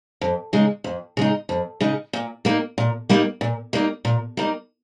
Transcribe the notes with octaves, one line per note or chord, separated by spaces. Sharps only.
F2
C#3 G#3 D#4
F2
C#3 G#3 D#4
F2
C#3 G#3 D#4
A#2
G3 A#3 D#4
A#2
G3 A#3 D#4
A#2
G3 A#3 D#4
A#2
G3 A#3 D#4